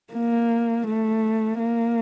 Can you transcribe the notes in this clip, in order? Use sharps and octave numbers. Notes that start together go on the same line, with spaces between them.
A#3
A3
A#3